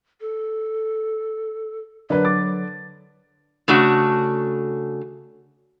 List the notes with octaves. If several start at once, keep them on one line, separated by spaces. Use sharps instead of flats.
A4
D3 F#3 D4 A#4 B4
D6 A6
C#3 A3 D4 F#4